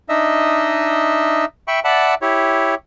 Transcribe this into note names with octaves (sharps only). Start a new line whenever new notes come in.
D4 D#4 D#5 E5
E5 G5 B5 C#6
D5 E5 F#5 A5 B5
E4 G4 C#5